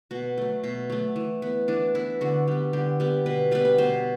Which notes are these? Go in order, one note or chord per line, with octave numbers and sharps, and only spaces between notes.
B2 F#4
F#3 A3
B2
F#3 A3
E3
B3
E3 D4
B3 E4
D3 F#4
G3 B3
D3 G4
G3 B3
B2 B4
G3 B3 B4
B4
B2 C5